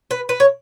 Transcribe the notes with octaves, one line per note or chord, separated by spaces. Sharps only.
B4
B4
C#5